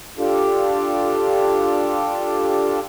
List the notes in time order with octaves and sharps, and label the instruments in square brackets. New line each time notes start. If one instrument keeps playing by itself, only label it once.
[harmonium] D4 F4 G4 A4